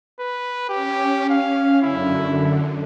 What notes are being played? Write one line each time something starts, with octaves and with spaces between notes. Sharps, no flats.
B4
C#4 G4
F5
F#2 D3 E4